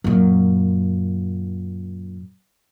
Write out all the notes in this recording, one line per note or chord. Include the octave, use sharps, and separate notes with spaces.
F#2 A#2